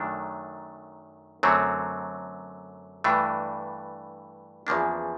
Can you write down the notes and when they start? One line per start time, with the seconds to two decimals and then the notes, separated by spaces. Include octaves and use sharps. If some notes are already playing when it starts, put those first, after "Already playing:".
Already playing: F#2 D#3 F#3 A3 D4
1.43 F#2 D3 F#3 A3 C4
3.04 G2 E3 A3 D4
4.67 E2 C#3 F3 A#3 D4